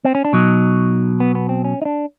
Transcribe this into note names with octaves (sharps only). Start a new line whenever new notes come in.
C4
C#4
D4
B2 F#3 D#4
B3
B3
C4
C#4
D#4
D4